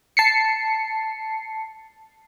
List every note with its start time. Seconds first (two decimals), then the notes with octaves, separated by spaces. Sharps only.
0.17 A5 C7 C#7